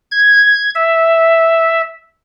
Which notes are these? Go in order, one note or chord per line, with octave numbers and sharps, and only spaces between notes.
G#6
E5